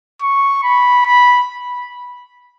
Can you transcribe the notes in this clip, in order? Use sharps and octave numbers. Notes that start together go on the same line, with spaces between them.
C#6
B5
B5